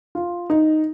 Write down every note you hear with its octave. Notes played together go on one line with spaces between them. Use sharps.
F4
D#4